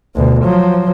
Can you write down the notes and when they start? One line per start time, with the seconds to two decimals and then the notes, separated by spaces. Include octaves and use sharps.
0.16 D2 B2
0.44 F3 F#3